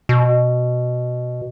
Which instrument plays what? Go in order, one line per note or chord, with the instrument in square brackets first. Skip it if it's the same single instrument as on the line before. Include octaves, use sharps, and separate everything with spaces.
[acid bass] B2